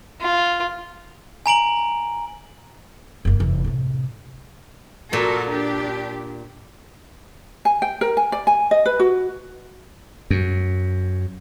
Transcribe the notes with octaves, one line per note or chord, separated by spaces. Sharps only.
F4
G#5 A#5 D7 F#7
F#1 A#3
F1 E3
A2 C3
A#2 F#4 A4 A#4
D4 G4
G#5
G5
A#4
G#5
D5
G#5
D#5
B4
F#4
F#2